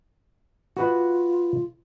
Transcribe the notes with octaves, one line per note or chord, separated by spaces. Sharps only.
F4 F#4 B4 F#5